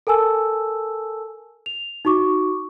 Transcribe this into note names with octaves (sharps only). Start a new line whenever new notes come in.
A4 A#4 G#5 A5 E6
F7
D#4 F#4 C#6 D6